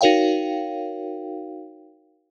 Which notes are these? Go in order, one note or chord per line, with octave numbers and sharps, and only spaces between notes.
D#4 F#4 A#4 C#5 F5 G5